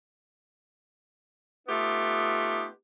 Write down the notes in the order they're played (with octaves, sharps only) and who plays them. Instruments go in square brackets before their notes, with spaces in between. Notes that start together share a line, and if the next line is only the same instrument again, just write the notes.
[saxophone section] A3 B3 D#4 F4 G4